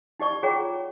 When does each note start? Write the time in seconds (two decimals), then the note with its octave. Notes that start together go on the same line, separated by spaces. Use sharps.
0.20 D#4 G4 D5 C#6
0.43 F4 G#4 C#5 F#5 G5 A#5